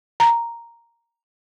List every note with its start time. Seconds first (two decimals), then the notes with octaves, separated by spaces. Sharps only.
0.20 A#5